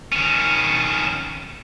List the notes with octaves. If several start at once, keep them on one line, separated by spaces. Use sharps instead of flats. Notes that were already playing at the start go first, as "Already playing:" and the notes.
D#3 C#4